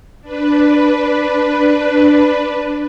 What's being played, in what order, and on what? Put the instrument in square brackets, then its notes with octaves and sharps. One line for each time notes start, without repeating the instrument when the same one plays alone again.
[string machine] D4 B4